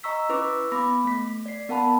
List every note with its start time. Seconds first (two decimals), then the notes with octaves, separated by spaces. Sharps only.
0.04 D#5 A#5 C#6 E6 B6
0.29 C#4 E4 B4 C#6 D6 E6
0.72 B3 B5 D6 A#6
1.04 A3 B6
1.46 D5 C7
1.69 B3 A#4 F#5 A5 B5